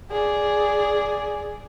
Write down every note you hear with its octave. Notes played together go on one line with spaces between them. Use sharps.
G#4 D5